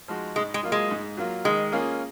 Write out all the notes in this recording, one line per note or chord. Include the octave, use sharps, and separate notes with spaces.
F3 G#3 D#4 F#4
G#2 G#3
G#3
F#3 A#3 F4
G#3
G#2
F#3 A#3 F4
D#3 G#3
A#3 C#4 F4 G#4